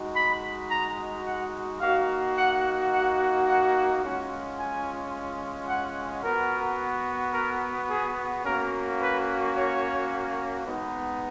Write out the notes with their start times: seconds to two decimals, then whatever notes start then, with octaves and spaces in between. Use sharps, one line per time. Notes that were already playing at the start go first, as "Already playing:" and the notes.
Already playing: G#3 D#4 F#4
0.15 B5
0.71 A#5
1.25 F#5
1.81 A#3 D#4 F#4 F5
2.37 F#5
2.92 F#5
3.48 F#5
4.03 G#3 C#4 F4 F#5
4.58 G#5
5.68 F#5
6.24 B3 F#4 A#4
7.34 A#4
7.89 G#4
8.44 A#3 C#4 F#4 A#4
9.01 B4
9.56 C#5
10.66 G#3 B3 D#4